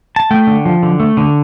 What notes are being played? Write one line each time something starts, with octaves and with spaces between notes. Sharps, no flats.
A5
A3 G5
D3
F3
D3
A3
D3